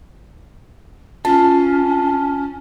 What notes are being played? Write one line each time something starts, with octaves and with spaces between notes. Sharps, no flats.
C#4 F4 A5